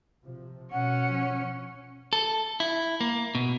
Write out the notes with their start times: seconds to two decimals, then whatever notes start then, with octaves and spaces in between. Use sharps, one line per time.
0.24 C3 F3
0.72 B2 C#4 F#5
1.07 F3
2.13 A4
2.60 E4
3.01 A#3
3.35 B2